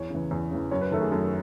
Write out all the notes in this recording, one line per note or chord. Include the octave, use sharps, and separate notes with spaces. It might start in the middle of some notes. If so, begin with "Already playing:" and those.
Already playing: E2 C#5
C#3 E3
E2
C#3 E3
F#2 C#5
B4
D#3 A3 A4
G#4
F#2 A4